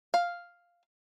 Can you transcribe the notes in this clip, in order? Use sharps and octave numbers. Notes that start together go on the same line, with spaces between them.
F5